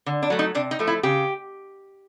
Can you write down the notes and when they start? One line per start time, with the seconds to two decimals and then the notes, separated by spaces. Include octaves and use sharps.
0.06 D3
0.23 D4
0.30 F#3 A3
0.39 D#4
0.55 C3 D4
0.71 D#4
0.79 F3 A3
0.87 E4
1.03 C#3 G4